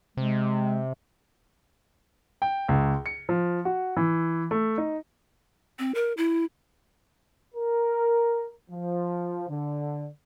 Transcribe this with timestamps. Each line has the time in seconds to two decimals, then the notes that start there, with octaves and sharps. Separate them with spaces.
0.17 C3 G#3
2.42 G5
2.68 C#2
3.06 C#7
3.29 F3
3.65 F#4
3.97 E3
4.51 A3
4.78 D#4
5.79 C4
5.95 A#4
6.17 E4
7.54 A#4
8.70 F3
9.49 D3